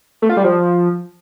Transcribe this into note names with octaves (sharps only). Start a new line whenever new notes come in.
A3
F4
G3
F3